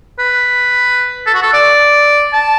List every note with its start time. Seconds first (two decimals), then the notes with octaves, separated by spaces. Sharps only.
0.19 B4
1.26 A4
1.34 F#4
1.42 A4
1.54 D5
2.33 A5